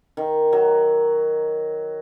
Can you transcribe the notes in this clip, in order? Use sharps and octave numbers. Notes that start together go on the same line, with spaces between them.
D#3
F#3